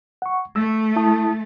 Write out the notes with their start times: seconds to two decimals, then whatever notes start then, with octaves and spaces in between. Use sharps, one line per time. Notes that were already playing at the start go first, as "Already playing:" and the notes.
0.22 F#5 C#6
0.56 A3 E6
0.96 E4 A5 D#6